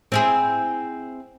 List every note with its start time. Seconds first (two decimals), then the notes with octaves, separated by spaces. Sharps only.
0.12 C4 E4 G#4